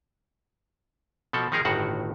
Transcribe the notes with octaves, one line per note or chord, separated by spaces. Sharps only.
B2 F3 A4
D#3 F3 D#4 G#4 A#4
G1 A2 D#3 F#4 F#5